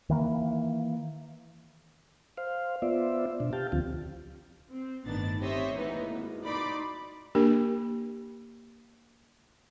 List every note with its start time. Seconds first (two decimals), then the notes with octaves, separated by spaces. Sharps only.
0.10 D#3 E3 A#3
2.37 C5 F5
2.82 B3 F4 C5 D5 E5
3.40 B2 D4
3.53 G4 F5 G5 A5
3.72 D2 D3 F3 C4 F4
4.70 C4
5.06 G1 A2 D#3 B3 D4 A6
5.40 C4 G4 C5 C#5 D#5 E5
5.77 E3 G#3 A#3 B3 D#4 E4
6.07 G#1
6.43 D#4 F#4 D5 B5 C6 D6
7.35 A#3 D4 G4 A#4